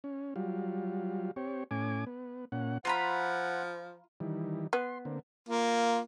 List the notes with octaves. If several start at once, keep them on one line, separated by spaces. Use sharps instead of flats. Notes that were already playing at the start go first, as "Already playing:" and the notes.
C#4
F#3 G3 F4
C4 G4 C#5
A2 C#4 G#5 D6
B3
A#2 C#4 F#5
F3 F4 F#5 A#5 B5
D#3 E3 G3
B3 C6
D3 A#3 C4
A#3 F4